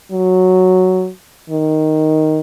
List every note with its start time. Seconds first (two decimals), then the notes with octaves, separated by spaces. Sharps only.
0.12 F#3
1.50 D#3